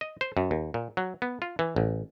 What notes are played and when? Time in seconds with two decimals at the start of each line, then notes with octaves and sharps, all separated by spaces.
0.01 D#5
0.21 C5
0.37 F#2
0.51 D#2
0.74 A#2
0.97 F#3
1.22 B3
1.42 F4
1.59 E3
1.76 A1